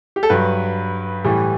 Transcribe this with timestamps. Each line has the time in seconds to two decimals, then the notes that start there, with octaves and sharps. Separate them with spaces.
0.16 G4
0.23 A4
0.30 G2 F#3 B4
1.24 A2 E3 G3